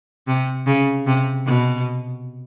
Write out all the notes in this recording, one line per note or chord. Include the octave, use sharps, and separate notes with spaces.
C3
C#3
C3
B2